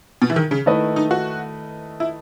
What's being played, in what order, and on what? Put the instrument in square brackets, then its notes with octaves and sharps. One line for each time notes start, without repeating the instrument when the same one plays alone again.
[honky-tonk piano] B2
E3
D#3
C#3
[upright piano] D#3 A3 E4 B4 D#5
[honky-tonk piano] D#4
F#4
E4